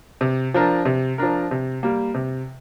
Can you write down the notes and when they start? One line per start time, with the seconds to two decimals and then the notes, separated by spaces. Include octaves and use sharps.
0.21 C3
0.54 F3 D4 A#4
0.85 C3
1.18 F3 D4 A#4
1.51 C3
1.83 G3 A#3
2.15 C3